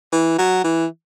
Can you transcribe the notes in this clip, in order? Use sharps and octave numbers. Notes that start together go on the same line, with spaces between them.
E3
F#3
E3